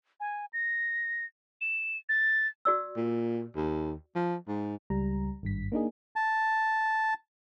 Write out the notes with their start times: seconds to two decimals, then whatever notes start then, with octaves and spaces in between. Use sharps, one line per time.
0.20 G#5
0.53 A#6
1.61 E7
2.09 A6
2.65 F#4 D5 E6
2.97 A#2
3.56 D#2
4.15 F3
4.48 G#2
4.90 C#2 G3 A#5
5.43 G#1 G2 B6
5.72 A#3 D4 D#4 G#4
6.16 A5